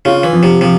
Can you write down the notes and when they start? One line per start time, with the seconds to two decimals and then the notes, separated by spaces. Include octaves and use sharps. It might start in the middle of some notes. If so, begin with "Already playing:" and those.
0.05 C#3 F4
0.23 E3
0.33 F3
0.43 C3
0.61 C3 F3